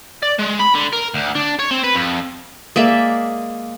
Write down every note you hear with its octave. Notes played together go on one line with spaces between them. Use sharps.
D5
G#3
B5
D3
A#4
D2
D4
C#5
C4
B4
F2
G#3 A#3 D5 E5